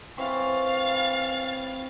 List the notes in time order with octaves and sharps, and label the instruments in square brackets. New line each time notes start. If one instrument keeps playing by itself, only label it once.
[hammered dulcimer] E3 C4 C#5 [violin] F5 A6